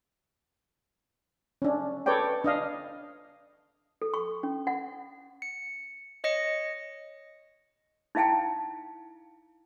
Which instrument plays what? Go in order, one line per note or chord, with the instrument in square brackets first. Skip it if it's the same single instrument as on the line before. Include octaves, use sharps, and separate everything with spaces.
[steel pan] C#4 D4
A4 B4 C#5 D5 G5
D4 D#5 F5
[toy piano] A4
C#6
C#4
F#5
[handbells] C#7
C#5 D#5 A#6 C#7
[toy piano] D#4 E4 F5 G5 A5